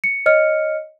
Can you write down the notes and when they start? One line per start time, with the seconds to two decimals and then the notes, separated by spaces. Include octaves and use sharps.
0.04 C#7
0.26 C#5 D#5 F6 C#7